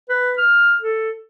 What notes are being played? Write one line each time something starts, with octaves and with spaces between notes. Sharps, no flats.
B4
F6
A4